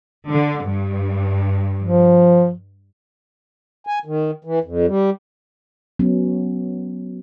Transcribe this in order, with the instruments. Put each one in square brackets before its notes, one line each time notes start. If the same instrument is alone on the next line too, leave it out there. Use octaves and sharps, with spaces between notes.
[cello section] D3
G2
[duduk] F3
[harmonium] G#5
D#3
E3
F2
G3
[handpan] F#3 B3 C#4